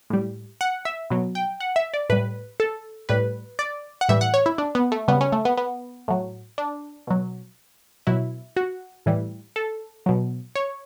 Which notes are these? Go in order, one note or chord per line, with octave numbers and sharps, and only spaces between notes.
A2 G3
F#5
E5
B2 F#3
G5
F#5
E5
D5
A2 G3 B4
A4
A2 G3 B4
D5
F#5
A2 E3 G3 E5
F#5
C#5
E4
D4
B3
A3
C#3 G3 B3
C#4
A3
B3
B3
A2 F#3
D4
B2 F#3
B2 F#3 E4
F#4
A2 E3 G3
A4
B2 F#3
C#5